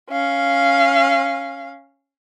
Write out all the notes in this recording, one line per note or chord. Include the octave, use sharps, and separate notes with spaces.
C#4 F5